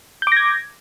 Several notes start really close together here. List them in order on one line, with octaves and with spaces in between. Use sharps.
G6 D6 A#6 G#6